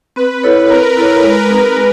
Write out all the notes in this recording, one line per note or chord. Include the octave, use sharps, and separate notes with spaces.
C4 B4
E4 A4 C#5
C4 A#4
E4 A4 C#5
G#3
C4 D#4 G#4
G#3